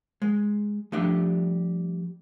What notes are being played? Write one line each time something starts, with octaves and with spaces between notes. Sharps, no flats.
G#3
F3 G3 A3 D4 G4